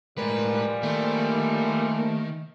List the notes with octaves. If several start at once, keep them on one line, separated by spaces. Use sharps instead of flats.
A2 E3 F3 G3 G#3 A#4 B4
D#3 A3 A#3